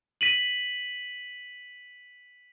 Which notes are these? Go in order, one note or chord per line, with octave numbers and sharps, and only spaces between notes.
B6 D#7 F#7